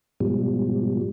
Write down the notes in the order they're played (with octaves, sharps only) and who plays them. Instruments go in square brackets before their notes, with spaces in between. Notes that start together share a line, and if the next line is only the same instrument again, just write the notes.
[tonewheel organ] G#2 B2 F3 G3